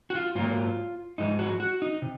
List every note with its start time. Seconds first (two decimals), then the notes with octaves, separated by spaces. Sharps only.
0.10 F#4
0.15 F4
0.35 G#2 F#3 A#3 F4
1.18 G#2 F3 G#3 D#4
1.39 F#4
1.60 F#4
1.82 D#4
2.02 C3